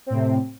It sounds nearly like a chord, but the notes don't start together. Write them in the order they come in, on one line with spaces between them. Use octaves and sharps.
C4 A2 C3